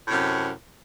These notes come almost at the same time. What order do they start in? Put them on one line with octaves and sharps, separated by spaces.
A2 C3 F#2